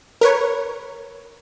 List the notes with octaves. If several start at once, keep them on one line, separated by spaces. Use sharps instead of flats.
A#4 B4 C#5